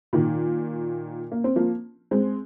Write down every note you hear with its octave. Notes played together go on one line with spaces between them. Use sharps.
A#2 D#3
A#3
C4
F3 A#3
G#3 C4